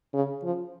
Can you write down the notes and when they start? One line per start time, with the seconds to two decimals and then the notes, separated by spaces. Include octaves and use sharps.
0.13 C#3
0.44 F3